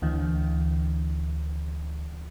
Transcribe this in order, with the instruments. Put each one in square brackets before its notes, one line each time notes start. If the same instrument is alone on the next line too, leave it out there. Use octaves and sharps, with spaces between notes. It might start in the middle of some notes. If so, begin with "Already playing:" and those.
[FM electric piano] D2 D3 E3